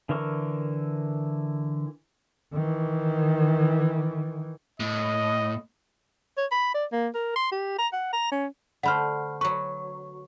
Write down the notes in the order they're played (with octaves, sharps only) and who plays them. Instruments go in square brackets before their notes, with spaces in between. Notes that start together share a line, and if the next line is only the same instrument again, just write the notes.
[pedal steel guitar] D3 E3 A#4 C#6
[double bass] D#3 E3
[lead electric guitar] A2 [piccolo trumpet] D#5
[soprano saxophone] C#5
B5
D5
A#3
A#4
C6
G4
A#5
F#5
A#5
C#4
[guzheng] D3 A3 C5 [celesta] F#5 B5 F6
[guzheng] F#3 B4 [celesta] C#6